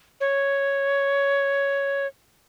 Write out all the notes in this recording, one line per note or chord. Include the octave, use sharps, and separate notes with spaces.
C#5